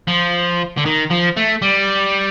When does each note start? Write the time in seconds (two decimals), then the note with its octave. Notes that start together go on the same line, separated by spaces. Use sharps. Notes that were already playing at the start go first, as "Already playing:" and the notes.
0.07 F3
0.77 D3
0.85 D#3
1.10 F3
1.37 A3
1.62 G3